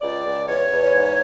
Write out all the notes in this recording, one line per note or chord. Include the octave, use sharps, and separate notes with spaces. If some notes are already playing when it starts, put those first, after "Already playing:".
C#2 D5
C#2
E2 C#5
E2
G#2